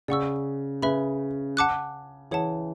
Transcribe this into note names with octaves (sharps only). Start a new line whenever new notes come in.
C#3 D5 F#5 C#6 E6
C#3 B4 E5 B5
F#5 A5 D6 F#6
E3 G#4 C#5 F#5 A5